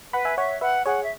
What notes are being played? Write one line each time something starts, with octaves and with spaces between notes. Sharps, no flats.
B4 F#5 B5
E5 G#5
C#5 E5 F#5
B4 E5 F#5
G#4 C#5 F#5
E5